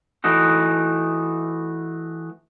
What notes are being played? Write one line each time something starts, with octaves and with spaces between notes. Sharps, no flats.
E3 A3 D#4 F#4